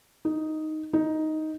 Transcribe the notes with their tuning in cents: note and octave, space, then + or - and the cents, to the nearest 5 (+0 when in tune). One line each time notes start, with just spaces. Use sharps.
D#4 +0
D#4 +5